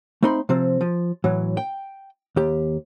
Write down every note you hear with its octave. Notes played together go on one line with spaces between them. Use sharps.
A3 C4 D#4 B5 C6
C3 F3 C4
F3
A2 E3 F#3
G5
D#2 G4